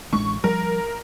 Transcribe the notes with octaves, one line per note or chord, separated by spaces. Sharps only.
A1 G#3 D4 C#6
F3 G3 A#4